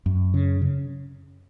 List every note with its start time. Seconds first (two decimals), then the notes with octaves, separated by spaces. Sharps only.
0.06 F#2
0.34 C#3
0.62 C#3